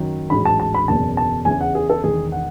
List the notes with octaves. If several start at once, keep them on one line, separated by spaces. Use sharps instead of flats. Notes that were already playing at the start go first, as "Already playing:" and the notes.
Already playing: F#1 F#2 D#3 F#3
A1 G#2 F#3 B5
A5
A5
B5
F#1 E2 B2 A5
A5
E2 C#3 E3 G#5
F#5
G#4
A4
E1 E2 D#3 G#4
F#5